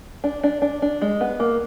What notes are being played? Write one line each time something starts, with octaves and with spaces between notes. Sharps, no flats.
D4
D4
D4
D4
G#3
B3
A#3